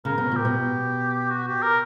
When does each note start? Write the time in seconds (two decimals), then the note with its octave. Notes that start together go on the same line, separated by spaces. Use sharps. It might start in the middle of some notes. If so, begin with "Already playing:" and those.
0.05 C#3 A#4
0.18 B2
0.31 A#2
0.37 G4
0.45 B2
1.30 F#4
1.47 G4
1.62 A#4